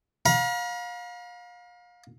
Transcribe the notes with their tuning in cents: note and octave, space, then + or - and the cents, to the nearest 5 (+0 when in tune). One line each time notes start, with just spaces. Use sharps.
F5 +30 A#5 +45